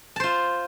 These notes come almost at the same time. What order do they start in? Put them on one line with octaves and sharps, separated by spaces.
A5 C5 F4